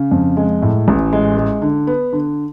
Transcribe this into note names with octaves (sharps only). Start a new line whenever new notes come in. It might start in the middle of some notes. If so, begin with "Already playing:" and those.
Already playing: C#3
F2
G#3
A2
A1
G#3
G#3
D3
B3
D3